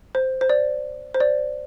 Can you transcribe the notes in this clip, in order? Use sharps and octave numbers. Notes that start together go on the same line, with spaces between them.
C5
C5
D5
C5
D5